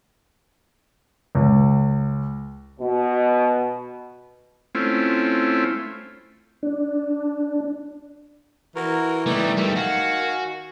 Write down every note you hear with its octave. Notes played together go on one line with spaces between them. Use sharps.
C#2
B2
A3 C4 C#4 E4 F4
D4
E3 F#4 A#4
E3 G3 A3 D#4 E4 D5
D#3 G3 A3 E5
F#4 F5 G#5